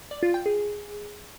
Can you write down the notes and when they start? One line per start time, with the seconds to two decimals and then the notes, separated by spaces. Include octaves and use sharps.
0.11 D5
0.23 F4
0.34 G5
0.46 G#4